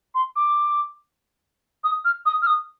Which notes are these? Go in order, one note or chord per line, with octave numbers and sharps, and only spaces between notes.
C6
D6
D#6
F6
D#6
F6
D#6